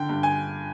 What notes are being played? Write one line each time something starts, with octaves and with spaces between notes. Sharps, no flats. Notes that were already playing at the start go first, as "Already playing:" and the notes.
Already playing: D3 G5
G2
G#5